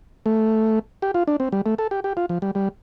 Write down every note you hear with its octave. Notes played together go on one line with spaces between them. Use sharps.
A3
G4
F4
D4
C4
G3
A3
A4
G4
G4
F4
F3
G3
G3